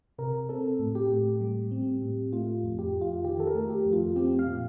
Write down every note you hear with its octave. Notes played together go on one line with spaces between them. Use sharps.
C3 A#4
C4 A4
A2
G4
A2
G3
C4
A2
A3 F4
F2
G4
F2
F4
D#3 G4
A4
A#4
A3
G4
F2
F4
C4 G4
F5
A#2